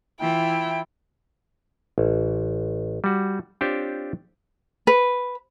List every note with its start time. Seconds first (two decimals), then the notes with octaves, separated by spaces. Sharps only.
0.21 E3 E4 F4 G5
1.98 A1
3.04 G3 F#4
3.61 C4 D4 F4 G4 C5 C#5
4.87 B4